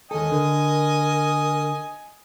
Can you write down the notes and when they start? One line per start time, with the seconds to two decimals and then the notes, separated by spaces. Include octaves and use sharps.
0.11 D#2 A4 D#5 G#5 D#6
0.31 D3 A#4